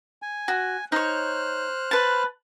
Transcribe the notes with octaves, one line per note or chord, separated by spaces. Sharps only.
G#5
F#4
D#4 C5 C#5 F6 F#6
B4 A5